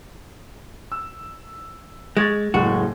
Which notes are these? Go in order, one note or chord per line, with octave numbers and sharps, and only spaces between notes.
E6
G#3 C#6 G#6 A6
F#1 A2 G#3 F#4